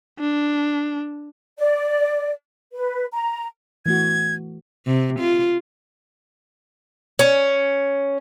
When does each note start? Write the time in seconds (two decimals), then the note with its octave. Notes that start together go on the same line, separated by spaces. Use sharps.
0.20 D4
1.58 D5
2.73 B4
3.13 A#5
3.86 E3 A3 F#4 G#6
4.87 C3
5.20 F4
7.19 C#4